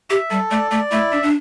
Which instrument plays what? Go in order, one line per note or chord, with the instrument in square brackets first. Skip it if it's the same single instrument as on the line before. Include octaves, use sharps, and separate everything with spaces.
[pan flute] G4 [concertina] E5
[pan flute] G3 [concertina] A4
[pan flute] A3 [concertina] D5
[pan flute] A3 [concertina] D5
[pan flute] A3 [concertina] E4
[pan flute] D4 [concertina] E5
[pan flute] D4